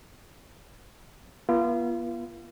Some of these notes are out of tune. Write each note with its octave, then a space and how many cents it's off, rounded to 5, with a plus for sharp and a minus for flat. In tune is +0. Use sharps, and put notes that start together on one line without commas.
B3 -40 F4 -35